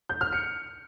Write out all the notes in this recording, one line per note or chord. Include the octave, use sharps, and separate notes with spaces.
G6
F6
C#7